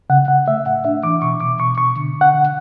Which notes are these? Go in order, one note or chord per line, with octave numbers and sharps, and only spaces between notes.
C#3 F#5
C#3 F#5
A3 E5
A2 F#5
D4 E5
E3 D6
B2 C#6
B2 D6
B2 C#6
B2 C#6
D3
D3
F#5
D3